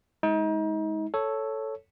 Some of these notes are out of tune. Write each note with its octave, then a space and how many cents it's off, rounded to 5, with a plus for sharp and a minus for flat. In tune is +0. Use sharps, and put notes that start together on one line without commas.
G#3 +10 D#4 +35
A4 +0 C#5 +0